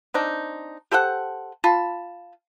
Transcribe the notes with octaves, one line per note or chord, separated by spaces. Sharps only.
C4 D4 D#4
G4 A4 C5 F#5
F4 A5 B5